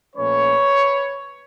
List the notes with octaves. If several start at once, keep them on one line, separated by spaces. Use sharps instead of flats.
A#2 F3 A3 C#4 B4 C#5